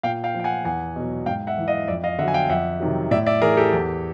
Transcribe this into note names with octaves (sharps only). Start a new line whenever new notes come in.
A#2 F5 G5
F5 G5
F3
G5
F#5 G#5
E2 F#5 G#5
B2 F#3
G#2 F5 G5
E5 F#5
E3
D#5 F5
F2 D5 E5
D#5 F5
D3 F#3 E5 F#5 G#5
F5 G5
F2 E5 F#5
C3 D#3 F#3
A2 D5 E5
D5 E5
E3 G#4 A#4
G4 A4
E2